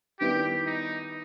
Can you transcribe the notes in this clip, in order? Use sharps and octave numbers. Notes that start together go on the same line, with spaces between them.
D#3 G3 B3 E4 G4
D#4